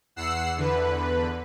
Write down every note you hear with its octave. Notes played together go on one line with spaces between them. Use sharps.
E2 F#5 E6 C7
E2 D3 B4